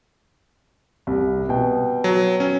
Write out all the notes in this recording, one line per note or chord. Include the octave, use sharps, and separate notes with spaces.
C2
B2 G5
F#3
C#4